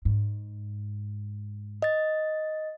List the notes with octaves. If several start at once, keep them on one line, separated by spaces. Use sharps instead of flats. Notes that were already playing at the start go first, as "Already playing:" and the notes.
G#2
D#5 A6